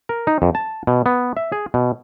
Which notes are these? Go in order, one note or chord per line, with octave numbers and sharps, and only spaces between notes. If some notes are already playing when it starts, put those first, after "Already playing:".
A#4
D#4
F2
A5
B2
B3
E5
G#4
B2